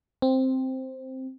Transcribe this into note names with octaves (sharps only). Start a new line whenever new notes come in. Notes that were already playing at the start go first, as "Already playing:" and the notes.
C4